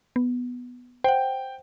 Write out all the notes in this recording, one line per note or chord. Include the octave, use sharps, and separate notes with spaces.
B3
C5 F#5 G5